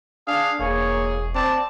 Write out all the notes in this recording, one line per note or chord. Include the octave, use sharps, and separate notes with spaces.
D4 G#4 F5
E1 A#3 G#4 C#5
C4 D5 A5